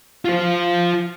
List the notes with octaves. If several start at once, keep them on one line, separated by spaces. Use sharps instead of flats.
F4 C5